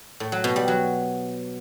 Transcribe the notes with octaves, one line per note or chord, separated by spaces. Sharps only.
A2
F#3
B2
G3
F#3